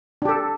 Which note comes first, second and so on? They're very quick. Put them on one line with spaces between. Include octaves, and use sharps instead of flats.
D4 G4 A4